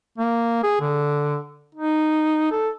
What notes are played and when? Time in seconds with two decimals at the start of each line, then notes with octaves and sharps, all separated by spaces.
0.18 A#3
0.63 G#4
0.81 D3
1.75 D#4
2.51 A4